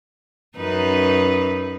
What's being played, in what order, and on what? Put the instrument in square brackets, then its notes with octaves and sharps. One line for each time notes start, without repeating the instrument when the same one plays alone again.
[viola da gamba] F#2 D#4 B4